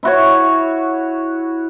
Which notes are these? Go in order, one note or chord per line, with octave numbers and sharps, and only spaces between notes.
E4 F#4 C#5